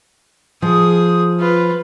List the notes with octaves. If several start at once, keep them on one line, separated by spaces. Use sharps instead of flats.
F3 G#4 D#6
F4 B4